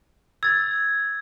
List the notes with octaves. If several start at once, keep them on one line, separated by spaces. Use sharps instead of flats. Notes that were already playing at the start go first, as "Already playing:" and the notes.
E6 G#6 A6